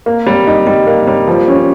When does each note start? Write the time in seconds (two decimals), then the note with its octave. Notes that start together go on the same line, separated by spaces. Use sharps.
0.06 A#3
0.27 G3
0.47 D#4
0.67 G3
0.87 A#3
1.07 G3
1.28 F3
1.48 C#4